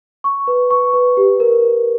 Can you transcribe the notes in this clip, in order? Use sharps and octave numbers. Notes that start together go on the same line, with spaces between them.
C#6
B4
C#6
B4
G4
A#4